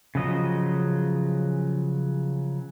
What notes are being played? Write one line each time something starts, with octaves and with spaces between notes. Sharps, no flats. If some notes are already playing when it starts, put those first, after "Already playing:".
C#3 F3 F#3 D#5